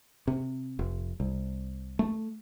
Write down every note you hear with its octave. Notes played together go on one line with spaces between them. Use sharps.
C3
F1
C2
A3